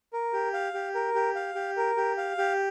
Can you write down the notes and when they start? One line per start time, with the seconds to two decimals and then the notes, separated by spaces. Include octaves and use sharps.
0.13 A#4
0.33 G4
0.53 F5
0.74 G4
0.95 A#4
1.15 G4
1.35 F5
1.55 G4
1.77 A#4
1.97 G4
2.18 F5
2.38 G4